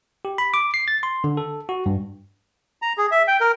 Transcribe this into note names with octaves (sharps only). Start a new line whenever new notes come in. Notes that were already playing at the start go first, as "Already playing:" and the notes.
G4
B5
D6
C7
A6
C6
D3
A4
F#4
G2
A#5
G#4
E5
G5
A#4